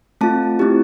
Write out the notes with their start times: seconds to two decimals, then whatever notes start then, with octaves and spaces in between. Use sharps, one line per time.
0.21 A3 C4 F4 A5
0.59 A3 C4 E4 G4